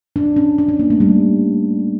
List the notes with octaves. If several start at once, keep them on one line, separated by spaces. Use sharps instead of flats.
D4
C#4
D4
C#4
A#3
A3
G3